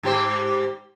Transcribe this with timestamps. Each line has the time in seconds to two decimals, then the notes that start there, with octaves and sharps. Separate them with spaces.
0.03 G#2 G4 C5